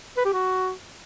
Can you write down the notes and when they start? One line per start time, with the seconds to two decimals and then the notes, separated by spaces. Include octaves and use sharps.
0.17 B4
0.25 G4
0.33 F#4